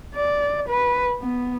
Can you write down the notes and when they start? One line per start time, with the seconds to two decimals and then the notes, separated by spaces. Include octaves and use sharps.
0.14 D5
0.68 B4
1.21 B3